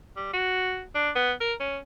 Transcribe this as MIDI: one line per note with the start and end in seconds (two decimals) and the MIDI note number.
0.16 0.29 55
0.33 0.83 66
0.95 1.10 62
1.15 1.32 59
1.40 1.53 70
1.60 1.78 61